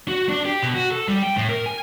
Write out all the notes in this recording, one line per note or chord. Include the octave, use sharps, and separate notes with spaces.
F#4
D4
G4
B2
F#4
A4
G3
G5
A2
A#4
G#5